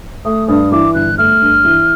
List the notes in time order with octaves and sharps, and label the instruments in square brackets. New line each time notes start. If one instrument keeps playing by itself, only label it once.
[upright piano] A3 [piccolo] D#6
[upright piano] G2 [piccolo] D#6
[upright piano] E3 [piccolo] D6
[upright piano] G1 [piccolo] F#6
[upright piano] A3 [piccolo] F6
[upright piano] G2
E3